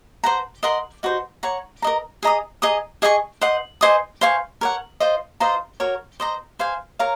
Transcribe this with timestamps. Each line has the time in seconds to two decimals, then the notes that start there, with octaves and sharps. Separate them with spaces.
0.24 C5 F#5 A#5
0.63 A#4 D#5 F#5 C6
1.03 D#4 F#4 C5
1.43 C#5 F#5 A#5 C#6
1.82 A#4 D#5 A#5
2.23 G#4 D#5 A#5 D#6
2.62 G#4 D#5 A#5 D#6
3.02 G#4 D#5 G#5 C#6
3.41 C5 D#5 F#5
3.81 C5 D#5 G#5 D#6
4.21 C5 F5 G#5 C#6
4.61 A#4 C#5 F#5
5.00 F4 C5 D#5
5.40 F4 C5 D#5 A#5
5.80 F#4 A#4 C#5
6.20 C5 D#5 A#5
6.59 C5 F5 G#5
6.99 A#4 C#5 F5 A#5